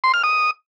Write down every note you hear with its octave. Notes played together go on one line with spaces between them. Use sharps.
C6
F6
D#6